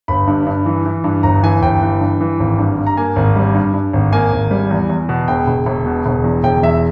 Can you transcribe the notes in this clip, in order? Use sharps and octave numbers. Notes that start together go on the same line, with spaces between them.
G1 B5
G2
G2
E3
E3
G2
G1 A#5
E3 G#5
G1 G5
E3
G2
E3
G#1
G2
G2
A#5
A#3 G#5
G#1
G3
G2
G2
G#1
A#3 G#5
G#1
G3
E2
E2
B2
E1 G5
E1
E1
B2
E1
E2
E1 G5
E2 E5